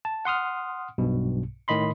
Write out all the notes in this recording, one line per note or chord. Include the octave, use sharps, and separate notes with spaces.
A5
F#5 C6 D#6 F6
B1 G2 B2
A2 D#3 D#5 B5 C6